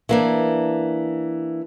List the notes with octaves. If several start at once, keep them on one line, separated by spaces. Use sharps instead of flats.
E3 A#3 D4